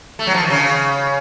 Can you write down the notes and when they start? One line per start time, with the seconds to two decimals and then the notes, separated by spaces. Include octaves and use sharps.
0.19 A3
0.27 F#3
0.34 F3
0.43 D#3
0.50 C#3